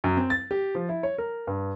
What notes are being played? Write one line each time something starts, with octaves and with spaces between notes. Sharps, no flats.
F#2
C4
A6
G4
F3
E4
C#5
A#4
G2